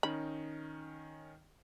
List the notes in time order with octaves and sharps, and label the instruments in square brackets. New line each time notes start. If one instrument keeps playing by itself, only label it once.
[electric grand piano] D#3 C#4 D#4 [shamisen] B5